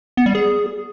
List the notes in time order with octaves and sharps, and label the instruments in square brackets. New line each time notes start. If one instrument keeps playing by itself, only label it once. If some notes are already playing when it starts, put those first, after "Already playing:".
[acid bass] B3
G3
G#4